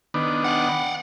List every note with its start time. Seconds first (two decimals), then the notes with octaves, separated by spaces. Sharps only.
0.14 D#3 B3 D4
0.44 F5 F#5